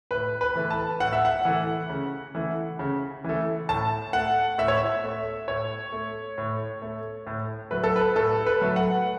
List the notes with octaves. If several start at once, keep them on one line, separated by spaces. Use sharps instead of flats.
A2 B4
B4
E3 A3
A5
A2 F#5
E5
F#5
E3 A3
C#3
E3 A3
C#3
E3 A3
A2 A5
A3 F#5
A2 E5
C#5
E5
A3
A2 C#5
A3
A2
A3
A2
F#3 A3 B4
A4
B4
A2 A4
B4
F#3 A3
F#5